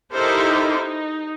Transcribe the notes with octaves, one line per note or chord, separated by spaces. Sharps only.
D#4 E4 G4 A4 A#4 C5
D#4